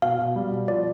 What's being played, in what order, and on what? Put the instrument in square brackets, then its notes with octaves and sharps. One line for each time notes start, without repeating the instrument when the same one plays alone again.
[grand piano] B2 [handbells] F5
[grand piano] B2
G3
B2
[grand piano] F3 [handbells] D5